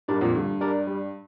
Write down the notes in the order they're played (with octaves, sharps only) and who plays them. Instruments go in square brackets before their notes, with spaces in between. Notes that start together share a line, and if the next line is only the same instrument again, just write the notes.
[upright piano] G2 [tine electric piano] G3 D4 A#4 D5
[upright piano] F2 A#2
[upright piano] G2 [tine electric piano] D3
[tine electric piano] G3 D4 A#4 D5
G3